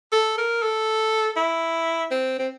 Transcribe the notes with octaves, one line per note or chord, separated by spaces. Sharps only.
A4
A#4
A4
E4
C4
C4